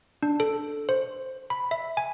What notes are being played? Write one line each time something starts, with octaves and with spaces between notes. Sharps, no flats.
D4
A4
C5
B5
E5
G#5